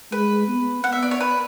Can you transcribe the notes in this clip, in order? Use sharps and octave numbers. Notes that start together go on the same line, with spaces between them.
G#3 B4
B3
B3 F#5
E5
D5
C#5
B4